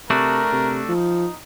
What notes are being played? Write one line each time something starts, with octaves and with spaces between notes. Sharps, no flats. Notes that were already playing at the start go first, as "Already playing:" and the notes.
C3 A3 D4 F#4 A#4
C3
F3 D#4